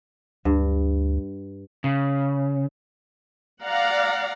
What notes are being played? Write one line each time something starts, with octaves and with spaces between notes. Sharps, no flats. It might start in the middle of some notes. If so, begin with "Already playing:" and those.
D2 G2
C#3
D5 F5 F#5 A#5